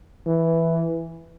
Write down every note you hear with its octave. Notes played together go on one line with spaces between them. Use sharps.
E3